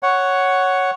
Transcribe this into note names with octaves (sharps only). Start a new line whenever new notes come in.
C#5 F#5